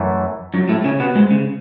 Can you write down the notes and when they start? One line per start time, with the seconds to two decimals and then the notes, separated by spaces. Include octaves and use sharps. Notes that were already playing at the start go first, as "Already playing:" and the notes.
Already playing: F#2 E3 A3
0.54 F#2 F#3
0.69 A2 A3
0.84 C#3 C#4
1.00 B2 B3
1.15 G#2 G#3
1.31 C#3